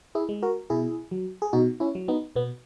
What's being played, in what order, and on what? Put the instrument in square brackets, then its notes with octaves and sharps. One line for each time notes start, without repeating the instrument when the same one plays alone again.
[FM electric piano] E4 G#4
G#3
F#4 A#4
B2 E4 G#4
F#3
G#4
B2 D#4 F#4
C#4 E4
F#3
B3 D#4
B2 B3